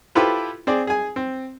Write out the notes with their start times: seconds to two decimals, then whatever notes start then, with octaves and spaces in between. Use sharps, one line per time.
0.15 E4 F4 G4 A4 B4 C5
0.67 C4 G#4 D5
0.87 G#4 G#5
1.16 C4